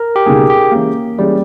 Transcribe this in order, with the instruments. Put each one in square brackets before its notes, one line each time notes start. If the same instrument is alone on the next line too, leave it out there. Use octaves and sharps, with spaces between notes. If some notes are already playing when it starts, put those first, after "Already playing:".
Already playing: [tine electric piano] A#4
G4
[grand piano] C#2 B2 G3 A#3 D#4 [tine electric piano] G#4
[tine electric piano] G4
[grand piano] E3 G#3 C#4 G4 [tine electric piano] A#3
[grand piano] E3 G#3 C#4 G4 [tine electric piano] G3